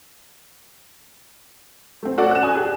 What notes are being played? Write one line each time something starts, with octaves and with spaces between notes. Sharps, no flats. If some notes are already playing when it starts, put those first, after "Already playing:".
A3 C4
C#4 F#4 A4 D5
F#6 E7
G#5 D#6
G4 G#4